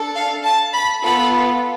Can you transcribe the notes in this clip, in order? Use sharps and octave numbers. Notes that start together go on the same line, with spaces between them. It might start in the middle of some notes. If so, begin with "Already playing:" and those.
Already playing: D4 A4
F5
A5
B5
B3 F4 A4 B5